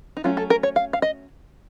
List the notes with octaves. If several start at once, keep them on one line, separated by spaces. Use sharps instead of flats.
D#4
F#3 A3 C#4 F4
A4
A#4
C#5
F5
F5
D#5